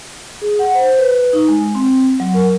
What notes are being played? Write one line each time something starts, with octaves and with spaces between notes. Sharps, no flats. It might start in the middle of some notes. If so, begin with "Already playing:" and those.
G#4
F#5
C5
B4
D#4
G#3
C4
F#3
A#4